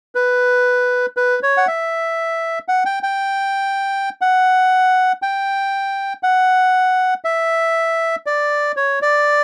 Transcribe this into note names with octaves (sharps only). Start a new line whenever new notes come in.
B4
B4
C#5
F#5
E5
F#5
G5
G5
F#5
G5
F#5
E5
D5
C#5
D5